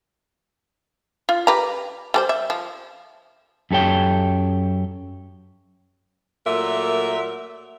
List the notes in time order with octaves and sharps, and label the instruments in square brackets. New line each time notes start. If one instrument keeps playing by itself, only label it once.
[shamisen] F4
G4 B4 A#5
G3 A4 C5
E5
F3
[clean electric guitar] F#2 G4 A4 C#5 G5
[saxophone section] A#2 F#3 A3 A#4 E5